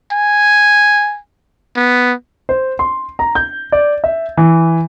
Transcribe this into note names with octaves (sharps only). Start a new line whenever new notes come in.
G#5
B3
C5
C6
A#5
G6
D5
E5
E3